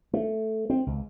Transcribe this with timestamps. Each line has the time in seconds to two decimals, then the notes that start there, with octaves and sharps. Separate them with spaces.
0.13 A3
0.70 C4
0.87 C#2